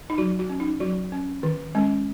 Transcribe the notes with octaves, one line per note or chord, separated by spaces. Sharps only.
D#4
F#3 F#4
F#4
C#4
D#4
F#3 F#4
C#4
D#3
G#3 C#4